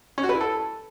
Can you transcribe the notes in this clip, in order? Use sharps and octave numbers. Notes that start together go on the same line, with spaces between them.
C#4
F#4
B4
E4
A4